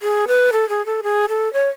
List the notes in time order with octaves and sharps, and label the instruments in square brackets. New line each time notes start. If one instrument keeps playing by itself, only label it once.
[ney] G#4
B4
A4
G#4
A4
G#4
A4
C#5